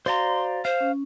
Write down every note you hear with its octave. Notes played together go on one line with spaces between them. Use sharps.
F#4 C5 D5 F5 A#5 C6
C5 F5
C#4